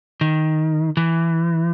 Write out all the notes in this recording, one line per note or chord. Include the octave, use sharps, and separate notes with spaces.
D#3
E3